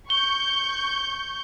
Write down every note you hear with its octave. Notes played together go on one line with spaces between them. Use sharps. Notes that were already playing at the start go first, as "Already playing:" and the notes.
C#6 G6 G7